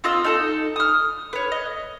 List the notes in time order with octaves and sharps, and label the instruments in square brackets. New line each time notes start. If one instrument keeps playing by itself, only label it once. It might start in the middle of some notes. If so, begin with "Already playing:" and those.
[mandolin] C4 F4 D#5 E6
D#4 A4
D#6 F6
B4 C#5
D#5